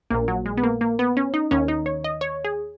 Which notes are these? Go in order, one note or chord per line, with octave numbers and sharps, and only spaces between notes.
A#1 A#2 A#3
F#3
G#3
B3
A#3
A#3
B3
C#4
D#4
D#2 D#3 C#4
D#4
C#5
D#5
C#5
G#4